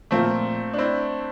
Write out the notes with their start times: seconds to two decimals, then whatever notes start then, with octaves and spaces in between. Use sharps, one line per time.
0.11 A#2 F3 A3 A#3 C4 F4 A#4
0.74 D4
0.78 C4 E4